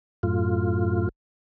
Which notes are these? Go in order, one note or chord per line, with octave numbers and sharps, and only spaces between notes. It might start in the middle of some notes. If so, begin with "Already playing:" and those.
F#2 A2 F4